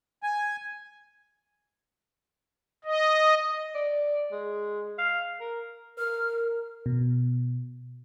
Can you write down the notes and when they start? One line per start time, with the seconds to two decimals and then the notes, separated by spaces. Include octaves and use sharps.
0.23 G#5
2.85 D#5
3.75 D5
4.32 G#3
4.99 F5
5.40 A#4
5.98 A#4 F6
6.86 B2